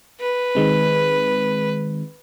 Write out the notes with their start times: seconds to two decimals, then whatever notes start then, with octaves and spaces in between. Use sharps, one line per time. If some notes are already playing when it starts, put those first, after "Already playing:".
0.20 B4
0.55 D#3 G#3 C4